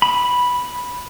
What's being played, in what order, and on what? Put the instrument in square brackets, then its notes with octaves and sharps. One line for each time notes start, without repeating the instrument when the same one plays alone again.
[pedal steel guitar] B5